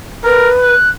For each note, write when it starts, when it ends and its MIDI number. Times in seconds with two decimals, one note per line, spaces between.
0.24 0.50 70
0.24 0.74 71
0.62 0.90 90